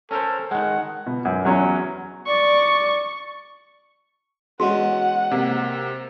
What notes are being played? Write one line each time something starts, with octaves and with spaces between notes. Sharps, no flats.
C#4 A4 A#4 C5
D#3 G#3 F#5
B2
F#2
E2 F#3 C#4 A#5
D5 C#6
E2 G#3 C#4 F#4 F#5
C3 A#3